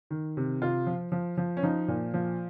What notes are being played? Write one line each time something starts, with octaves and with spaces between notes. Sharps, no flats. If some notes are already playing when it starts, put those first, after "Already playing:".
D#3
C3
C3 F4
F3
F3
F3
C#4
F3 D#4
A#2
F3